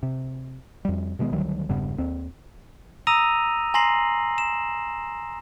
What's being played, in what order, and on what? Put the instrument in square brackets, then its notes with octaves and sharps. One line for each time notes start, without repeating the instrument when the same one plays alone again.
[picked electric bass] C3
F2 G3
B2 D#3 G#3 B3
D2 D#3 F#3 G3
E1 G2 C#3 B3
D#2 C4
[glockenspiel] A#5 D#6 E6 A#6 D#7 F7
G#5 A#5 C6 A#6 C7 F#7
E7